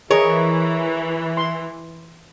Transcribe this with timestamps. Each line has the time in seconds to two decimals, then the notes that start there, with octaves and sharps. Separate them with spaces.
0.11 E3 G#4 A#4 C#5 D#5
1.37 C6